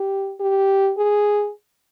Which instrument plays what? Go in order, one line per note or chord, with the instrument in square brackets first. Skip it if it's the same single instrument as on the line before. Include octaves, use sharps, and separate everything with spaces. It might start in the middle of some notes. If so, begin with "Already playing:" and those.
Already playing: [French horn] G4
G4
G#4